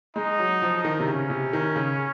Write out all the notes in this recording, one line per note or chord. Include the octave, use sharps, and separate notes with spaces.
G#3 D#4
F#3
F3
D#3
C3
C#3 C#4
C3
D#3
C#3